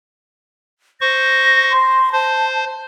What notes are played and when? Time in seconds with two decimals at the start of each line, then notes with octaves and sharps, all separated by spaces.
1.01 C5 C#6 A#6
1.71 C6
2.12 C5 A5